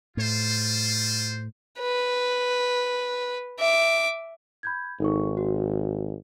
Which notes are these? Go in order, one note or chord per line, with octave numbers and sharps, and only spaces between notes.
A2 G3 F4 C5
B4
E5 D6
B5 G6 G#6
G#1 D#4 A4 C#6
F#4